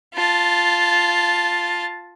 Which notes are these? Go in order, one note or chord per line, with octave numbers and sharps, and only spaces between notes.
F4 A5